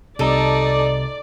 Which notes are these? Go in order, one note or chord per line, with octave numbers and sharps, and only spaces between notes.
C2 C3 D#4 A4 D5